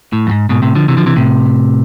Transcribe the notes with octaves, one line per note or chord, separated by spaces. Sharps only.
A2
F2
G#2
G#2 B2
A2 C3
D3 F3
C3 E3
D3 F3
C3 E3
A2 C3